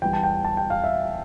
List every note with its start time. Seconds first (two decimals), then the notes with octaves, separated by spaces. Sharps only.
0.02 E2 E3 G3 G5
0.13 A5
0.23 G5
0.45 A5
0.57 G5
0.70 F5
0.84 E5